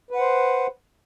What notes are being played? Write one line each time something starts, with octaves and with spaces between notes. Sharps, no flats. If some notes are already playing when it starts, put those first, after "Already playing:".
B4 C5 F#5